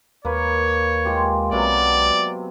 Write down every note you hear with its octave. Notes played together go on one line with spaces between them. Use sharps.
D#2 A#3 B4 C#5
G#3 F4 G4
B1 C3 F#3 B3 D5